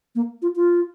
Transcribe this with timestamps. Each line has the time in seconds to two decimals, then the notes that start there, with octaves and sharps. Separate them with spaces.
0.15 A#3
0.42 F4
0.56 F4